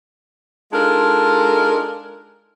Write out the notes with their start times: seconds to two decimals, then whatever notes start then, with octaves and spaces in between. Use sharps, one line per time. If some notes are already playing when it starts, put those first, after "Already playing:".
0.73 G#3 D4 D#4 F4 A4 A#4